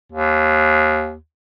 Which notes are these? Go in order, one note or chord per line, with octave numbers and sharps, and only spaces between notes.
D#2